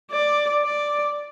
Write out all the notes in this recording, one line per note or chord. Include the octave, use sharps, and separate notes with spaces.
D5
D5